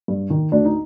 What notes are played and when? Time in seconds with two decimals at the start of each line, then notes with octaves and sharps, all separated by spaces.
0.08 G2
0.30 D#3
0.52 D2 D4
0.65 D#4